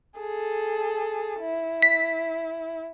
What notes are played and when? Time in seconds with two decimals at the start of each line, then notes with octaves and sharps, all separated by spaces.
0.18 G#4 A4
1.40 E4
1.82 B6